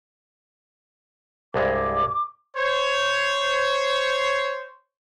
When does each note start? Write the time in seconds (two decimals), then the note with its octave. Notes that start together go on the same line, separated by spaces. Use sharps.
1.54 C2 G2 G#3 D6
2.56 C5 C#5